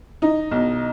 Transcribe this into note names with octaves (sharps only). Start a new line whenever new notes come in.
D#4
B1